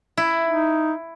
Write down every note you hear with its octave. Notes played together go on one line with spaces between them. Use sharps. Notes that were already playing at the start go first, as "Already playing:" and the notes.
E4
D#4